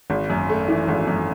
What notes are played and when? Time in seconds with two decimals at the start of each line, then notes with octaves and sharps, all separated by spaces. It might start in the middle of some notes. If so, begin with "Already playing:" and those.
0.10 G#1
0.30 F#2
0.50 A3
0.68 E3
0.88 G#1
1.07 F#2